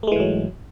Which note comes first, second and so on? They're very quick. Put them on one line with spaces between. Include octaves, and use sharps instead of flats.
A3 G#3 E3 G#2 F#3